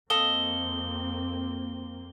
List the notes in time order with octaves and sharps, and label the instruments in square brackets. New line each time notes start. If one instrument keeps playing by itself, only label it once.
[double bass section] F2 A#3 C4 [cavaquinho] A4 D#5 F5 [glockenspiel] G7